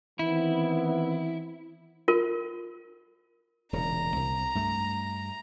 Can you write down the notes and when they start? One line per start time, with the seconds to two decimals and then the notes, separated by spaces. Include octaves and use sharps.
0.19 D#3 E3 B3 C4 E4
2.08 F4 A#4
3.73 E1 A#2 C#3 A#5
4.16 C2
4.55 G2 A3